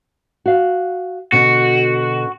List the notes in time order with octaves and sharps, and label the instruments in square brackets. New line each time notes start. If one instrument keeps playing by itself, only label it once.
[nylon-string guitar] F#4 F5
[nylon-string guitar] B2 D3 [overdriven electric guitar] F#4